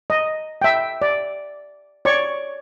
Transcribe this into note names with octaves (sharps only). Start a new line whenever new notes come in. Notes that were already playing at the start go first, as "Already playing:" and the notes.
D#5
E5 G5
D5
C#5 D5 C#6